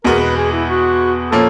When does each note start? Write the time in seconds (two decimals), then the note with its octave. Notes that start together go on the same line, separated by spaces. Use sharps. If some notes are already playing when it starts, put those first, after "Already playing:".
0.04 E2 B2 G#3 B3 A#4
0.21 B4
0.36 G#4
0.52 E4
0.68 F#4
1.32 A#2 F3 A#3 C#4 A4